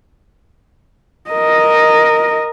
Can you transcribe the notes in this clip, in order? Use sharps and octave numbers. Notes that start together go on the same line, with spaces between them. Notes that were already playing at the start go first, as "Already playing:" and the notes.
A#4 D#5